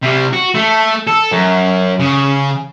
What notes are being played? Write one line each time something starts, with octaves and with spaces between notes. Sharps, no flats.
C3 G3
F#4
A3 A4
A4
F#2
C#3